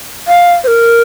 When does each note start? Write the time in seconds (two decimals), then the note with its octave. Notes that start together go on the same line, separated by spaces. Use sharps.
0.28 F5
0.64 C5
0.67 A#4